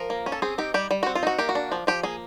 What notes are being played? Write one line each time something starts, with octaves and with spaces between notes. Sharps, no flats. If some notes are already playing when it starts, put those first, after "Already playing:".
Already playing: F3 A#4
A#3
C#4
A4
C4 G#4
D#4 G4
G3 G4
G3
F#4
C4
F4
D#4 F#4
A#3 G4
F#4
D4
F3
F3 G4
A#3 G#4